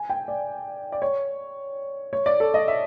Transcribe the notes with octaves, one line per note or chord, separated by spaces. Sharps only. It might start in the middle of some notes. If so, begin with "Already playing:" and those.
Already playing: G#5
G5
D5
D5
C#5
C#5
D5
A4
D#5
E5